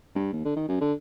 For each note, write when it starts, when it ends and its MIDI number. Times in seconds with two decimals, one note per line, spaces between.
0.16 0.29 43
0.33 0.40 39
0.45 0.54 50
0.56 0.66 51
0.69 0.79 42
0.81 0.93 50